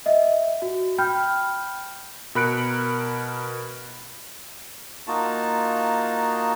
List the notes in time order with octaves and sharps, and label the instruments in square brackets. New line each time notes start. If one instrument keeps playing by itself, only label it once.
[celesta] D#5 E5
F#4
G5 B5 F6 G6
[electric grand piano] B2 A#4 B5 F#6 C#7 D7
[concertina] A#3 D#4 F4 F#4 A5